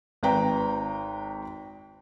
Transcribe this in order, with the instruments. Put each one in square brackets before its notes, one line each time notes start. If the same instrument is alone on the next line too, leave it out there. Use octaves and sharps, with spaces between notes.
[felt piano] G#1 B4 G5 A#5